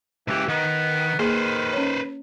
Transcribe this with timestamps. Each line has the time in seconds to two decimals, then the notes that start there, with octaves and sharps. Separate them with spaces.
0.28 C#2 E3 G4
0.48 D#3 B3
1.19 D#3 A#3 G#4 B4 C5
1.73 C#4 C#5